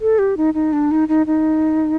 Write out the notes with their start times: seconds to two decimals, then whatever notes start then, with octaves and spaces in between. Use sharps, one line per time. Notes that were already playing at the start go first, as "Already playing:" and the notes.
0.01 A4
0.19 G4
0.37 D#4
0.54 D#4
0.73 D4
0.91 D#4
1.08 D#4
1.27 D#4